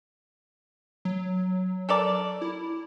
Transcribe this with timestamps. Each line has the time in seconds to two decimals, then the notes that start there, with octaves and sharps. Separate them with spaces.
1.05 F#3
1.89 A4 A#4 D5
2.41 E4